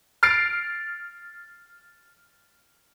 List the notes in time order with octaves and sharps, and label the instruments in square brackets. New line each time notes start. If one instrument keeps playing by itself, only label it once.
[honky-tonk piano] F6 A6 C7 D7